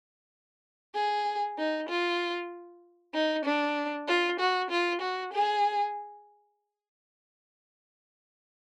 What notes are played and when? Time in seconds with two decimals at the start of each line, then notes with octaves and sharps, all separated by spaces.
0.94 G#4
1.58 D#4
1.89 F4
3.14 D#4
3.45 D4
4.08 F4
4.40 F#4
4.70 F4
5.01 F#4
5.33 G#4